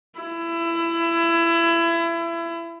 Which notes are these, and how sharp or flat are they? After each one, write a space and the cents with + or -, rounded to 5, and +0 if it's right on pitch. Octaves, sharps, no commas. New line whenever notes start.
E4 +25